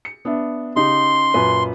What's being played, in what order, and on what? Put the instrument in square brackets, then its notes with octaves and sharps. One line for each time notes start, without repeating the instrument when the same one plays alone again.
[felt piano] C#7
B3 D4 E5
[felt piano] C#3 D#4 G4 [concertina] C6
[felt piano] F#2 A#2 B4